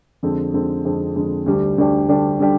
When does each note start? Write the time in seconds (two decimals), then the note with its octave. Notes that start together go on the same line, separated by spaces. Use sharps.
0.23 F2 D3 G#3 C4
0.54 F2 D3 G#3 C4
0.85 F2 D3 G#3 C4
1.15 F2 D3 G#3 C4
1.46 D2 D3 G3 D4 G4
1.78 D2 D3 G3 D4 G4
2.08 D2 D3 G3 D4 G4
2.40 D3 G3 D4 G4